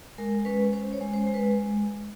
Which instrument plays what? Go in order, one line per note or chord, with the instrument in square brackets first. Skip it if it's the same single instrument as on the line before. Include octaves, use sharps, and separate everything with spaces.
[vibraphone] G#3 A#4
C#4 B4
C#4 C5
C#5
G#3
C5
G#3
B4